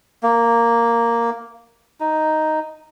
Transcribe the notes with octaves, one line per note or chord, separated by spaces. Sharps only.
A#3
D#4